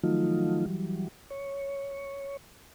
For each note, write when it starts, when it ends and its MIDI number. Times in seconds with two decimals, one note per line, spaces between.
0.03 0.65 51
0.03 0.65 53
0.03 0.65 54
0.03 0.65 57
0.03 0.65 63
0.03 0.65 65
0.66 1.08 52
0.66 1.08 54
0.66 1.08 55
1.31 2.37 73